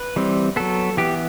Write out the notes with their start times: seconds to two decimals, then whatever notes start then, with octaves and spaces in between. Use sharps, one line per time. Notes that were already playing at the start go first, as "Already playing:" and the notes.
Already playing: B4
0.16 E3 G3 C4
0.56 F#3 B3 A4
0.97 E3 B3 G4